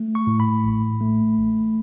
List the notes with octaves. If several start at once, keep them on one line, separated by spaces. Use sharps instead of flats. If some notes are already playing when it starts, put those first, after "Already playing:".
Already playing: A3
C#6
A2
B5
A1
A3
A1